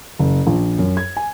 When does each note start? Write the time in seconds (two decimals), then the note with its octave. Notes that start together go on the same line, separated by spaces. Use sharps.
0.19 F#1
0.47 A#1
0.79 F#2
0.97 G#6
1.17 G#5